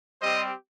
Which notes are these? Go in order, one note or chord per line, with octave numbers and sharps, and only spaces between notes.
G3 C4 G4 C5 D#5